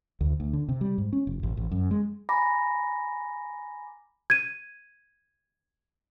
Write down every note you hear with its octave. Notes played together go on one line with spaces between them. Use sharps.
D2
D2
D3
C3
G3
G#2
C#4
F1
A1
A1
F#2
G#3
G#5 A#5 B5 D6 A#6
G#6 D#7